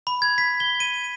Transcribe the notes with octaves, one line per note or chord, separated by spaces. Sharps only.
B5
G#6
B6
G7
D#7